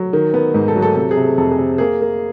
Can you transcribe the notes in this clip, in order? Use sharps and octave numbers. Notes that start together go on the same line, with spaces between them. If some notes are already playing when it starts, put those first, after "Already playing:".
Already playing: F#3
D#3
B3
G#2
A4
F#3
A4
C3 A4
G#4
C3
A4
F2 A4
G#4
C3
A#3 G#4
A#3